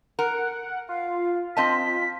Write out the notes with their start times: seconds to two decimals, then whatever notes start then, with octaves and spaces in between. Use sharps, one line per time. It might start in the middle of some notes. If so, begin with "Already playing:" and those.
0.19 A#4 F#5
0.89 F4 F5
1.57 C4 D#5 A5 B6